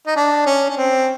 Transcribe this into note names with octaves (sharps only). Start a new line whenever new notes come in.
D#4
D4
C#4
C#4
C4